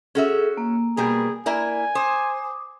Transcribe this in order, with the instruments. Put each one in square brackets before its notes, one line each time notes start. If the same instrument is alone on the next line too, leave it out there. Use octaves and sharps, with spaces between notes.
[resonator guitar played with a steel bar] C#4 F#4 E5 [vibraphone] G#4 A4
[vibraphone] A#3
[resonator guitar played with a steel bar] B2 G3 A#4 [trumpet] G#4
[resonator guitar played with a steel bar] A#3 E4 A#4 [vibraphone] D5 [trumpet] G#5
[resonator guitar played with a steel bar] C5 [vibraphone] D6 D#6